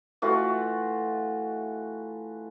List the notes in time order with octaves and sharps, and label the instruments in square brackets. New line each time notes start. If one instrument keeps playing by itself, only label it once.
[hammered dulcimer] E3 A3 F4 F#4